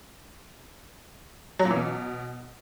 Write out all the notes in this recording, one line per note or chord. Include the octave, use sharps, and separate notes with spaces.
F#3
A#2
E3
B2